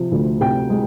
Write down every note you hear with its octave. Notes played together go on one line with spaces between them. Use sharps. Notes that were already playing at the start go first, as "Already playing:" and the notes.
Already playing: C3 F3
D2
C3 G5
G#3